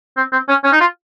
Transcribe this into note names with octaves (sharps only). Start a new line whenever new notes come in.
C4
C4
C#4
C#4
D#4
F4